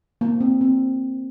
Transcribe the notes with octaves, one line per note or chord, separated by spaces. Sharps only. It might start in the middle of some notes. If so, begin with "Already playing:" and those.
A#3
C4
C4